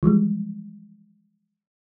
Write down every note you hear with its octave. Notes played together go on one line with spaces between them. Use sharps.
E3 F3 G3 G#3